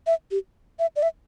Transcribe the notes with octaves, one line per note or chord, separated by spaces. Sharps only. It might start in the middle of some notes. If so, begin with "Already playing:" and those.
E5
G4
E5
D5
E5